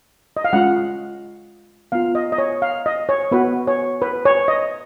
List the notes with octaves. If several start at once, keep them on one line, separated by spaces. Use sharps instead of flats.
D#5
F5
G#3 C#4 F4 F#5
B3 F4 F5
D#5
D#5
C#5
F5
D#5
C#5
B3 F#4 B4
C#5
B4
C#5
D#5